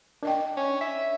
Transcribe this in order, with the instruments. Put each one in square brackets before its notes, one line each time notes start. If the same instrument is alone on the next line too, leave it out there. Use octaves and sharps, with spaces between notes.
[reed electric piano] D4 [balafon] A#4 D#5 G5
[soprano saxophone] C#4
E5